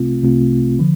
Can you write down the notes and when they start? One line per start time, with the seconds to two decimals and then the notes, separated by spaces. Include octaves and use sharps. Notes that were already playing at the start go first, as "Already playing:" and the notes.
Already playing: C2 C3 A3 C4 F4
0.22 C2 C3 A3 C4 F4
0.79 D3 F3